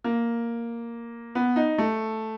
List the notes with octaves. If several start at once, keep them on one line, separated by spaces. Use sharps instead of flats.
A#3
B3
D#4
A3